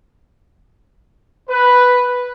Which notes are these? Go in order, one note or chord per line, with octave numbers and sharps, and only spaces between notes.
B4